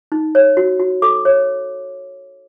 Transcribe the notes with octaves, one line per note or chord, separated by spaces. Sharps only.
D#4
C#5
F#4
F#4
A4 D6
C#5